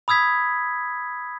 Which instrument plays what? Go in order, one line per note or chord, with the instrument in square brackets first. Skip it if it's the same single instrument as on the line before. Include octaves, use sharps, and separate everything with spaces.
[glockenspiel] B5 D#6 E6 G#6 B6